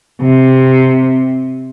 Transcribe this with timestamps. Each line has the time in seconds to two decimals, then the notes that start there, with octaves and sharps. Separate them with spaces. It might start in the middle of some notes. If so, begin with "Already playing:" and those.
0.22 C3